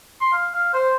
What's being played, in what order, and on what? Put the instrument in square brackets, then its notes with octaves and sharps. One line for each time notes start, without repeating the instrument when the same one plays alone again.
[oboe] C6
F5
F5
C5